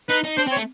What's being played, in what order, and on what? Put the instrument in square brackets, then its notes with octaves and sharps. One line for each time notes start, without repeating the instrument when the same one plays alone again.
[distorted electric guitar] D#4 [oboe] B4
[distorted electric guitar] D#4
[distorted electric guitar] D4 [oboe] C5
[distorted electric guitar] C4
[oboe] C#5
[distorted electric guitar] A3